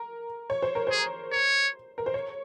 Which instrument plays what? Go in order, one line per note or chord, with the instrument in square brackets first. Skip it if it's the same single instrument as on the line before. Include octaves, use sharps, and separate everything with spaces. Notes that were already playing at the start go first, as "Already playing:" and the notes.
Already playing: [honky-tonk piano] A#4
C#5
C5
A#4
[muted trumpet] G#4 [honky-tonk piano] C5
[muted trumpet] C#5
[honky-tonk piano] A#4
C5
C#5